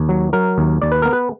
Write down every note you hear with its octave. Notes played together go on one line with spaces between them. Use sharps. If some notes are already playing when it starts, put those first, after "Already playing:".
Already playing: D#2
F#3
F#3 A#4
D#2
D#2 D5
B4
B3 A#4
B4